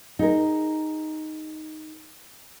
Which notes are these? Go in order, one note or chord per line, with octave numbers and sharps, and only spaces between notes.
D#4 G#4 A#4